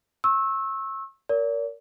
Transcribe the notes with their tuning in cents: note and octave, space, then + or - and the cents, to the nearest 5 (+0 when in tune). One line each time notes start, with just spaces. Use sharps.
C#6 -35 E6 -10
A#4 +0 D5 -45